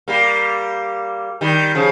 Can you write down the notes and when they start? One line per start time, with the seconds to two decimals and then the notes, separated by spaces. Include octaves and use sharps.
0.08 G3 A#3
1.41 D#3 G3
1.75 C#3 F3